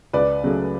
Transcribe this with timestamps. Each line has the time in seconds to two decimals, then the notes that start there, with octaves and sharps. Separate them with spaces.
0.13 C#2 B4 D5
0.44 C#3 F#3 A3